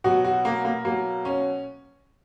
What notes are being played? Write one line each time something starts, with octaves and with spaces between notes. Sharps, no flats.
B2 F#3 F#4
F#4
A#3
A#3
B2 F#3 A#3
C#4